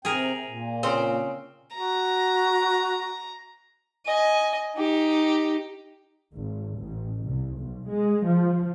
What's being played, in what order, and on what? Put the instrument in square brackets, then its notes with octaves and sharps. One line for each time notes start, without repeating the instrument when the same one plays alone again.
[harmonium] C3 G5 [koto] G#4 A#4
[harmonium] A#2
[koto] C#3 C4 C5
[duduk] F#4 [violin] A#5
[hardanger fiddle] D#5 G#5
D#4 G4
[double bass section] G#1
A1
C2
B1
G#3
F3